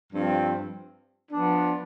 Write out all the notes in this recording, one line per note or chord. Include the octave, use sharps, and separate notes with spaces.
G2 F3 C4
F3 B3 D4